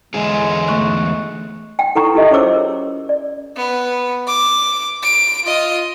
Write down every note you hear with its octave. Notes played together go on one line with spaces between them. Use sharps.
E2 D3 G#3 G#4
A3 C#6 F#6
F#5 G5
E4 A4 B4 F#5 A#5 C#6
E4 F4 G4 A4 D#5 E5
C#4 G#4 C5 C#5 D6 E6
A#4
D5
B3
D6
D7
F4 D#5